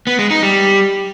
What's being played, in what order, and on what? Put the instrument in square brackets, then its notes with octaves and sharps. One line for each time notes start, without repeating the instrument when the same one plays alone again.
[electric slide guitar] B3
G#3
D#4
G3